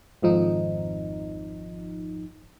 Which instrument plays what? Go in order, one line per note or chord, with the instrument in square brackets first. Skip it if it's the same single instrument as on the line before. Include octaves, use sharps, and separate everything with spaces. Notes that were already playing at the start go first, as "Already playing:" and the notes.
[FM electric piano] G#1 F2 F3 D#4